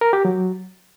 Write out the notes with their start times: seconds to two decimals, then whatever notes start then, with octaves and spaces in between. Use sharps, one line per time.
0.01 A#4
0.13 G4
0.25 F#3